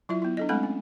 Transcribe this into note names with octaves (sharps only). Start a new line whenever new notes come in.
F#3 E4 F4 E5
B3 E4
D4 A4 D#5
G#3 A3 C4 A4 F#5 B5
C#4